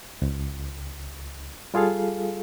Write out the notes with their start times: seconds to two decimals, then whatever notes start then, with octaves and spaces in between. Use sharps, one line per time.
0.22 C#2
1.74 G3 F4 G#4 A4 F5